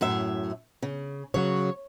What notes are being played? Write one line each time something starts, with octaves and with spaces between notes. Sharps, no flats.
F#2 A2 E5
C#3
C#3 F#3 F#4 C#5